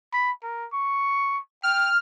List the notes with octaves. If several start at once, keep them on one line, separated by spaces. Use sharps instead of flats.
B5
A#4
C#6
G5 F6